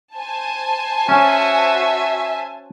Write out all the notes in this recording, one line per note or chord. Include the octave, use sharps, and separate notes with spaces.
C5 G#5 A5
C#4 F#4 E5